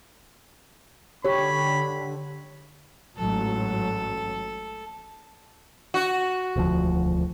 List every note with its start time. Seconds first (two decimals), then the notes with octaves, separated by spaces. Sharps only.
1.25 D3 G4 C#5 B5
3.17 A1 G#2 F#3 A4
5.94 F#4
6.56 E1 D2 F3